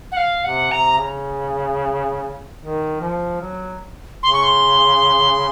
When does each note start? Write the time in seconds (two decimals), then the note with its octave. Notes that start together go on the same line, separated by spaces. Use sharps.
0.12 F#5
0.17 F5
0.44 C3 F#5
0.71 C3 A#5
0.98 C#3
2.60 D#3
3.01 F3
3.42 F#3
4.23 C#3 C6
4.33 C#6
4.43 C6